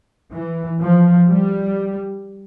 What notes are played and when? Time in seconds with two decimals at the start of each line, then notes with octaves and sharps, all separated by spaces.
0.32 E3
0.80 F3
1.28 G3